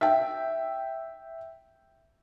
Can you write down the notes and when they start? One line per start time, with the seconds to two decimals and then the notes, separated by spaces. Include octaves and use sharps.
0.01 E5 G5